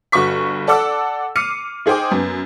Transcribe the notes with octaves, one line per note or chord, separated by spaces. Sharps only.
G1 F#4 B4 C#6 B6
A4 D5 F#5 D6 E6
D6 F6 C7 C#7 D#7
D#4 G#4 C5 G5 D6
F#2 B3